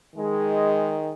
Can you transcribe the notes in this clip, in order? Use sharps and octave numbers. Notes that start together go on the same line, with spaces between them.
D#3 G#3